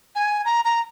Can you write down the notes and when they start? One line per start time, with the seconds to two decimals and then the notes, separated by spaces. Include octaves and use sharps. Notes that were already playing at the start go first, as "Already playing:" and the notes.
0.15 G#5
0.45 A#5
0.65 A#5